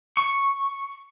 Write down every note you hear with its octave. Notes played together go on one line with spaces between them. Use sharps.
C#6